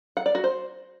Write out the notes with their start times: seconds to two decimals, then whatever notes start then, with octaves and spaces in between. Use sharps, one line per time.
0.17 F#5
0.26 D5
0.35 F#4
0.44 C5